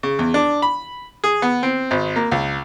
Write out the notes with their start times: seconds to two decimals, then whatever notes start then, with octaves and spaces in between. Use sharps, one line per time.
0.03 C#3
0.19 E2
0.34 D4
0.62 B5
1.24 G#4
1.42 B3
1.63 C4
1.91 G#1
2.16 A#3
2.32 C#2